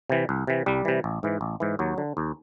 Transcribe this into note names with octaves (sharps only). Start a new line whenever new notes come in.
C3 E3
C2
C3 E3
C2 G3
C3 E3
A1
G#2 E3
A1
G#2 E3
D#2 F#3
D3
D#2